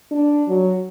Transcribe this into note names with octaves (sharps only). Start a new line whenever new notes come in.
D4
F#3